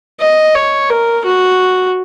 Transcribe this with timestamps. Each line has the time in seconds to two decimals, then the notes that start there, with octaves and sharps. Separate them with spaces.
0.21 D#5
0.55 C#5
0.90 A#4
1.25 F#4